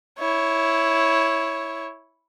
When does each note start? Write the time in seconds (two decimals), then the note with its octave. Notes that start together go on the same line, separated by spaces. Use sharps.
0.19 E4 C#5